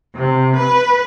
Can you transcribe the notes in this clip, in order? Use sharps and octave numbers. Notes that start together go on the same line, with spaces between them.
C3
B4